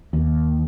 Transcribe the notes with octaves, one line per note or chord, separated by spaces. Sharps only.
D#2